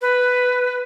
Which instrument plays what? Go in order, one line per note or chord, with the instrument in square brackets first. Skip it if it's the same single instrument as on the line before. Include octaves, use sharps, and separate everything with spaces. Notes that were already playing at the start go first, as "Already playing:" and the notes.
[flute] B4